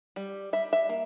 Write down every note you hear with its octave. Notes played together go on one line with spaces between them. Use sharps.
G3
G3 E5
E5
A#3